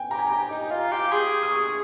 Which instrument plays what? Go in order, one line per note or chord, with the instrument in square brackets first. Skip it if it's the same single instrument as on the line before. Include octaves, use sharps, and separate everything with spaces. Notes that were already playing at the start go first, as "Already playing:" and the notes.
Already playing: [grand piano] G5 G#5
[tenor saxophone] G4 [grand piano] A#5
[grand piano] G#5
[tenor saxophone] G4 [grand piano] A#5
[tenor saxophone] D#4
F4
G4
[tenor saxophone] G#4 [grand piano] C6
[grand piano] D#6
C#6